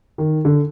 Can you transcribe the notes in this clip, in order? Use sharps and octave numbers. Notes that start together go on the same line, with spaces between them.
D#3
D3